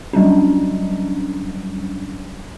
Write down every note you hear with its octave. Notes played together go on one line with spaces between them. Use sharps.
F#3 G3 C#4 D4